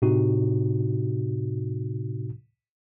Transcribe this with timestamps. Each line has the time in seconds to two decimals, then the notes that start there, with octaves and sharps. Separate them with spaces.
0.02 A2 C3 D#4 F#4